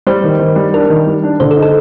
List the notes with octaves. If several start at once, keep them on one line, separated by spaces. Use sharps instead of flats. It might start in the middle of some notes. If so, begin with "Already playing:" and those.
G3 C5
D#3
D#3
G3
D4 A#4
D#3
G3
D4
D3 C5
A4
D#4
A4